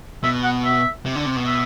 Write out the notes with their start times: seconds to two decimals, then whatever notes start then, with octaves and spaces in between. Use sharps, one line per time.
0.23 B2 E5
0.44 F#5
0.64 E5
1.06 C3
1.16 D3
1.26 C3
1.36 B2
1.46 E5